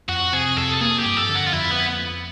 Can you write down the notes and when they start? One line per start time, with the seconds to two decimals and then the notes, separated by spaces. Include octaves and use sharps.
0.09 F2 F#4
0.33 C3 G#4
0.57 F2 A4
0.74 A4
0.81 A#3 G#4
0.99 G4
1.05 G2
1.17 A4
1.29 D3
1.35 F#4
1.47 F4
1.53 F2 E4
1.71 B3